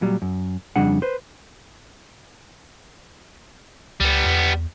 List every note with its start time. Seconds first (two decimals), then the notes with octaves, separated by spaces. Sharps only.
0.01 A#2 F#3 G3
0.22 F#2
0.76 F2 C#3 G3 D4 G#4 F#5
1.02 B4 C5
4.00 C#2 G3 B3
4.25 E2